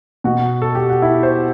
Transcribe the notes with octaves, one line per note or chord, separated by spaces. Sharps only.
B2 F#4
A4
G4
F#4
E4
C5